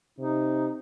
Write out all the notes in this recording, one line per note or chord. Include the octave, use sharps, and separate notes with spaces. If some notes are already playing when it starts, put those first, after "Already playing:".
C3 D#4